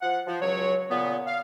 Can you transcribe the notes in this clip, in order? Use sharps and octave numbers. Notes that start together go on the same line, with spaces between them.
F3 F#5
F3
C#2 F#3 C#5
A#2 C#3 B3
F5